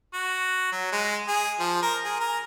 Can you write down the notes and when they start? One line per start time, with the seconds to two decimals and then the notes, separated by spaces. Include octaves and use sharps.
0.14 F#4
0.72 F#3
0.92 G#3
1.28 G#4
1.60 F3
1.82 A#4
2.04 G#4
2.20 A#4